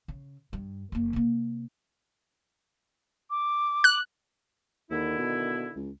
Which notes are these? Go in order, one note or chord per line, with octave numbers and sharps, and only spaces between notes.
C#3
G2
F#1 A#3
C3 A#3
D6
F#6
D#2 D3 D#3 E4
B2
C#2